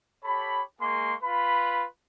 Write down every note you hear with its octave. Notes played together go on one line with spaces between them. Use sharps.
G4 A4 C#5 B5
G#3 A#3 G#4 C6 C#6
F4 B4 B5